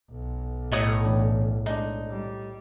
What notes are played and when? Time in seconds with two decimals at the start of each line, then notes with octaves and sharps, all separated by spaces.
0.11 B1
0.72 A2 D#4 C#5 D#6
1.05 A1 D4
1.66 G#3 D4 D#4
2.09 G3